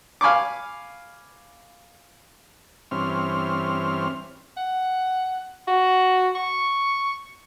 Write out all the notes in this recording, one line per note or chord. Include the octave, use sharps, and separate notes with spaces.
F5 G#5 B5 C#6 D6
G2 E3 C4 C#4 F6
F#5
F#4
C#6